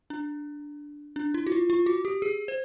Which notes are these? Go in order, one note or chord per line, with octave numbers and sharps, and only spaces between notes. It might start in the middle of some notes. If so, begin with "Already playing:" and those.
D4
D4
E4
F#4
F4
F4
F#4
G4
G#4
C5